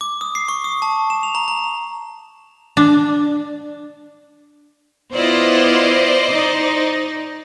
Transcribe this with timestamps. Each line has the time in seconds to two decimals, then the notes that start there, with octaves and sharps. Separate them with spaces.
0.01 D6
0.21 D#6
0.35 C7
0.48 C#6
0.64 D#6
0.82 A5
1.10 E7
1.23 F7
1.35 A#5
1.48 A#5
2.77 D4
5.13 B3 E4 F4 C5 D5 D#5
6.30 D#4